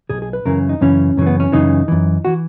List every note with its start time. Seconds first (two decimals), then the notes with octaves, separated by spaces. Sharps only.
0.10 A#2 G#4
0.13 B1
0.22 G#4
0.33 B4
0.45 F#2 C#3 E3 A#4
0.69 D#4
0.81 F#2 C#3 E3 C#4
1.17 F#2 C#3 E3
1.27 B3
1.40 C#4
1.52 F#2 C#3 E3 D#4
1.88 F#2 E3
2.25 E3 F#4